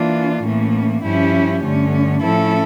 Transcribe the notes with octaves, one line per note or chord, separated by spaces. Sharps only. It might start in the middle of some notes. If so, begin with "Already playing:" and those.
Already playing: E3 A#3 D4 F4
A2 E3 A#3 C#4
G2 F3 C#4 E4 G4
G2 D3 A3 C#4
A2 F3 C#4 E4 A4